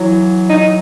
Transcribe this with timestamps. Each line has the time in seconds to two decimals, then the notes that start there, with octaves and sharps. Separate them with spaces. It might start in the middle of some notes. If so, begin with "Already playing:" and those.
Already playing: E3 F#3
0.49 D#4